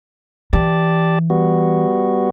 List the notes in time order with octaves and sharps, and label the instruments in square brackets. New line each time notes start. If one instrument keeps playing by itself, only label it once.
[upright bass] E3 [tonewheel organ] G4 D5 A5
[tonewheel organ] G3 B3 F#4